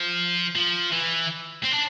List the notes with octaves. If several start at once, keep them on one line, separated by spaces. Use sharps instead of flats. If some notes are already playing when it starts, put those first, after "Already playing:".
Already playing: F3
F3
E3
C4
D4